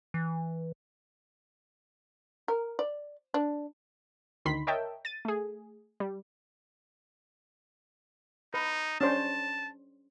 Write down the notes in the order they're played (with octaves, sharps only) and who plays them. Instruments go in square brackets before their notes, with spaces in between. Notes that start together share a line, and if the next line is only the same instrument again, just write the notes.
[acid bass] E3
[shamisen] A#4
D5
D4
[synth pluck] D2 D#3 B5 C6 B6
A#4 C#5 D#5 E5 G5 A5
A6 D#7
A3 G#4
G3
[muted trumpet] D#4 [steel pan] B4
[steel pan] C#4 D4 C5 [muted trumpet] A5